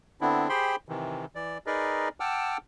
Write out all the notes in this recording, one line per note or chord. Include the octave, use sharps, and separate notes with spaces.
D3 B3 C4 D4 E4
G4 G#4 C5 G5 B5 C6
C3 D#3 E3
E3 D5
D#4 G#4 A#4 B4 D5 D#5
F#5 G5 A5 D6 E6 F6